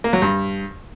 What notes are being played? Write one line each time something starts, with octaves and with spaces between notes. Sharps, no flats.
A#3
F#3
G2